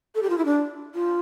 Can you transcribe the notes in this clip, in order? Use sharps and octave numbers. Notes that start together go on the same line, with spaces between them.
A4
G4
F4
E4
D4
F4